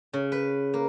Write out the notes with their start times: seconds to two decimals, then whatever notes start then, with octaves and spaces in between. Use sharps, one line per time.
0.13 C#3
0.32 B4
0.74 A#3